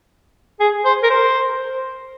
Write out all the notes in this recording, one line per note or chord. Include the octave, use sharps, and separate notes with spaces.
G#4
C5
A#4
C5